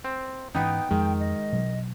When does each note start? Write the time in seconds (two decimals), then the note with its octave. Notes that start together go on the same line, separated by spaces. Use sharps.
0.04 C4
0.55 G#2 E3 B3 C#4 D#4 G5
0.91 F2 D#3 F3 G#3
1.20 D#5
1.53 B2 F#3